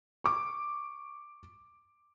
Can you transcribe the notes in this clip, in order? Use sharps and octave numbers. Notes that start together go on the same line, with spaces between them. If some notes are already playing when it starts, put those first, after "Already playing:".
C#6 D6